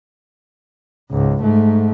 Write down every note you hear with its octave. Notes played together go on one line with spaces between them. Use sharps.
C#2 G#2
G#2 A3